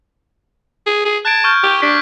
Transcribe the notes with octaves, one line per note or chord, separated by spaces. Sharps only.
G#4
G#4
A5 F#6 G#6 D7
C#6 F6 G6
G4
D4 B6